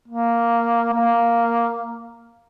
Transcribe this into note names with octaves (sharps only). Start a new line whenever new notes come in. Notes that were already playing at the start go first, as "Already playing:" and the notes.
A#3
A#3